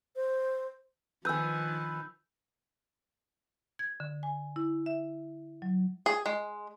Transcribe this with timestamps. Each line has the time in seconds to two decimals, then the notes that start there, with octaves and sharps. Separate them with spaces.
0.16 C5
1.25 D#3 F3 B4 G#5 E6 G6
3.79 G#6
4.00 D3
4.23 G#5
4.56 E4
4.86 E5
5.62 F#3
6.06 G#4
6.26 G#3